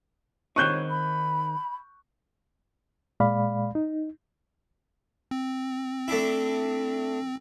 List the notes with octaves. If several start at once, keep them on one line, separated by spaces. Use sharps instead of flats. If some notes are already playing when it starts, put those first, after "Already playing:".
D#3 C4 D#4 C#5 C#6 F#6 G6
B5
A#2 G#3 D5 F5 B5
D#4
C4
A3 D4 E4